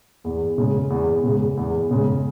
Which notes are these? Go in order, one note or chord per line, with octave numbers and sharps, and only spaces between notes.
E2
C#3 G#3
E2
C#3 G#3
E2
C#3 G#3